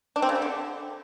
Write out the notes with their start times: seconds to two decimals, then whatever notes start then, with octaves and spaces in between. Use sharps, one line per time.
0.16 D4
0.22 C4
0.29 C#3
0.35 G3
0.42 D3